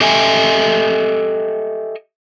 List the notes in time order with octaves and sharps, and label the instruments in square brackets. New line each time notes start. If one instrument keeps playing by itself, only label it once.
[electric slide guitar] G4 A4 D#5 E5 G5 G#5